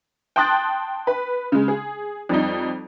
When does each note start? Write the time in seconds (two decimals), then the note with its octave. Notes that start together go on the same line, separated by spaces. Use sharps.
0.36 G5 A5 C6 D#6 F#6 A6
1.07 B4
1.52 C#3 G#3
1.68 G#4
2.29 F2 G3 D#4